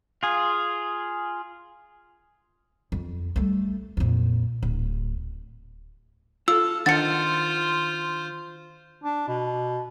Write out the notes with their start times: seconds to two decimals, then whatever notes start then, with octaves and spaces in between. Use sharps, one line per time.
0.23 F4 G#4
2.92 F2
3.36 G3 A3
3.97 F2 A#2
4.63 D1
6.48 F4 A4 E6
6.86 D#3 D4 F4 C5 F#5 A6 C#7
9.04 D4
9.28 B2